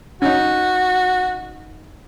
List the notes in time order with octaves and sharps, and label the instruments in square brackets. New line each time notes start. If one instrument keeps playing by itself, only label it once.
[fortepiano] C#4 D#4 [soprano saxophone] F#4